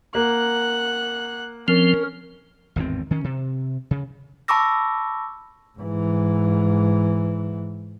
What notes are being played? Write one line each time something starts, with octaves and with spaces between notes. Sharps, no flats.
A#3 F#5 F#6
F3 C4 C#4 A#4
G#1 E2 A2 C4
D#3 C#4
C3
C#3
A5 B5 C#6 D6 E6 A#6
G#2 E3